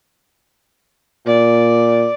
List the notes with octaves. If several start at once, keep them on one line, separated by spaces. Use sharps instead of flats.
A#2 D5